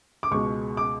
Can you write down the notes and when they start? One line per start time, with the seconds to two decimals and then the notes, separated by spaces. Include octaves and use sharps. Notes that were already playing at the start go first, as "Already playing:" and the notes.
0.23 D6
0.31 C#2 B2 G#3 C#6
0.77 D6